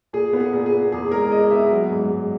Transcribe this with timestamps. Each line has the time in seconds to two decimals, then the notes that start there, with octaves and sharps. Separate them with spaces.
0.13 A#2 G#4
0.33 B3
0.40 G#4
0.53 A#2
0.66 G#4
0.73 B3
0.92 E2 G#4
1.11 G#3 A#4
1.32 G#3 D#5
1.51 B3 E5
1.71 F#3
1.90 G#2
2.10 G#2